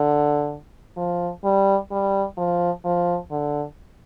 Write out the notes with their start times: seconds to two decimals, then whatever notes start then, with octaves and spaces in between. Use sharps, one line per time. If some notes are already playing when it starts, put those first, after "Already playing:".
Already playing: D3
0.97 F3
1.44 G3
1.91 G3
2.37 F3
2.84 F3
3.30 D3